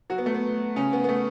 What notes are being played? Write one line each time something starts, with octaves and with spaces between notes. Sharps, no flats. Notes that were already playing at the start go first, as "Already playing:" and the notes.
F#3 F#4
B3
A3
B3
C#3 C#4
B3
B3
A3